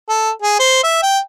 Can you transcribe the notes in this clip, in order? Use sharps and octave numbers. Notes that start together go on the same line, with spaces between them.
A4
G#4
C5
E5
G5